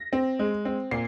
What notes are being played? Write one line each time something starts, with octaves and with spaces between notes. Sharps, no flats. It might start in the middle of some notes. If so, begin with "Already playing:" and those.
Already playing: A#6
C4
G#3
C4
A#2 C7